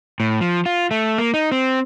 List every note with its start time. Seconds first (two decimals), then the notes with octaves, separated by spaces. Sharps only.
0.20 A2
0.41 F3
0.66 F4
0.91 A3
1.18 A#3
1.34 D#4
1.52 C4